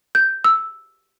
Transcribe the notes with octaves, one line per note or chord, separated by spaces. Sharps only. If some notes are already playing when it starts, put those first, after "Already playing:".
G6
E6